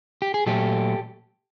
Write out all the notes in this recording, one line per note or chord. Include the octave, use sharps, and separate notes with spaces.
G4
G#4
A#2 F#3 A3 G4 A4